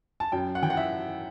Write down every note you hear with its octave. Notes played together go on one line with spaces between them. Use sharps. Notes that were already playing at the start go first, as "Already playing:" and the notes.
A5
F#2 G5
F#5
E3 G5
F#5
E5